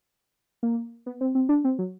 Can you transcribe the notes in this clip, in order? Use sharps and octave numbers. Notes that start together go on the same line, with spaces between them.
A#3
B3
C4
C4
D4
C4
F#3